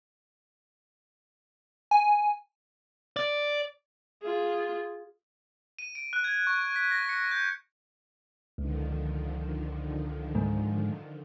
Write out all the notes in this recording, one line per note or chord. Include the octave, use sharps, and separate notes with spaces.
G#5
D5
F4 G#4
D#7
D7
F#6
G#6
C#6
B6
A#6
C#7
G6
C#2 D3 D#3 F3
G#2